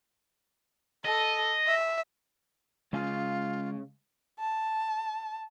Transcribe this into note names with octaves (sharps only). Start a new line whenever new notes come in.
A4 D#5
E5
C#3 G#3 F4 F5 G#5
A5